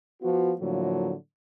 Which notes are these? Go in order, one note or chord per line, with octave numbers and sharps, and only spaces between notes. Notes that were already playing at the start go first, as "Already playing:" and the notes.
F3 B3 F4 F#4
A2 D3 F3 F#3 A3 A#3